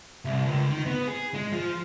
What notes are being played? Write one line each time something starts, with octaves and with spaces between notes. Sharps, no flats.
C2
C#2
D#3
B3
G#4
G#3
F3